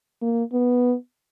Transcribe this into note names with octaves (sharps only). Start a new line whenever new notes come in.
A#3
B3